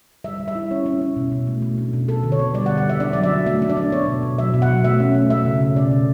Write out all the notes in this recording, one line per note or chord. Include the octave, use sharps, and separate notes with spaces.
G3 E5
G3
E5
E4
C#4 C#5
C#4
C#4
B2
B2
A3
A3
D4
B2
B3 A4
D3
C#5
B3
G3 D5
F#5
D3
F#5
D3 E5
D4 D5
F#3 D5
E5
F#3
A3 E5
D4
D5
D4
B3 C#5
B2
B2
F#3 E5
B2
F#5
F#3
A3 E5
C#4
A3
A3 E5
C#3
C#3
B2 D5
B2